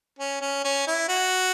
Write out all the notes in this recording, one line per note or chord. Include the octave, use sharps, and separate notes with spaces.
C#4
C#4
C#4
E4
F#4